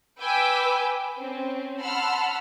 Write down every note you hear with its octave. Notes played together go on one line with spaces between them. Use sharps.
B4 G5 G#5 D6 E6
C4 C#4
F#5 A5 B5 C6 E6 F6